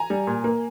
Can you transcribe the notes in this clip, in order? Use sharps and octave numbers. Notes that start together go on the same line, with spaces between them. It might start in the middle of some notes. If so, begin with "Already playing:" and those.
Already playing: G#5 A#5
G3
A#2
A#3